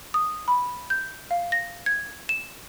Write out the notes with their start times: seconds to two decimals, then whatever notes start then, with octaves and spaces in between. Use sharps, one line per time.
0.14 D#6
0.48 B5
0.90 G6
1.31 F5
1.52 A#6
1.86 G#6
2.29 E7